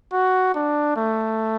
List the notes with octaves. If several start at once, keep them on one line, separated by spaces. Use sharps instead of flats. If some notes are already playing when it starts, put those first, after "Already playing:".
F#4
D4
A3